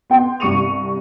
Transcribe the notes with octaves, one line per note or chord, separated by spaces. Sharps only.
B3 G5 C6
C2 G2 C#6 C#7 D#7 F7